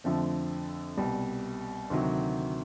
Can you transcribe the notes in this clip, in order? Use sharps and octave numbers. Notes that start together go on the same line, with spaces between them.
F2 D3 F3 A3 C4
C2 B2 G3
D2 C3 D#3 F#3